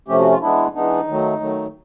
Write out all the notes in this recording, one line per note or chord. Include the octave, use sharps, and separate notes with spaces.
C3 F3 A3 C#4 G4
F#4
F4
E3 G#3 B3 D4 E4
E3 G#3 B3 D4 D#4
D#3 F#3 A3
D#3 F#3 A3